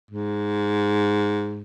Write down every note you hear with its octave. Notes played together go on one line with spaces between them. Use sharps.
G#2